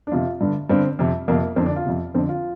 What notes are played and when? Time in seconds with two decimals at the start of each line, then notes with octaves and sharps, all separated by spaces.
0.07 D4
0.12 F2 C3 F4
0.41 G2 D3
0.70 G2 D3 C4
0.99 F2 C3
1.28 F2 C3 A#3
1.42 A#3
1.56 F2 D3 C4
1.66 D4
1.76 F4
1.85 F2 C3
2.14 F2 D3 C4
2.29 F4